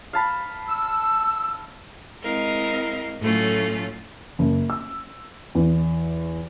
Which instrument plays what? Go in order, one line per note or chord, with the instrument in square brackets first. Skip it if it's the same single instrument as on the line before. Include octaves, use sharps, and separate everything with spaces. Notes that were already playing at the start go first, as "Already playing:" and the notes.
[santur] F5 A5 B5
[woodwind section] E6
[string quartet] G#3 C4 E4 A#4 D#5 F5
A2 F#3 A3 C#4 F4
[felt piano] F#1
E6
E2